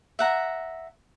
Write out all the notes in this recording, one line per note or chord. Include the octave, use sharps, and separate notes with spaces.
E5 F#5 A#5